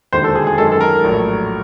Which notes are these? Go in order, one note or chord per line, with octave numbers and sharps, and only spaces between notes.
E1 D#2 D3 C5
A4
G#4
G#4
F#2 D#3 G#3 A4
A4
A#4
A#1 A2 F#3 A3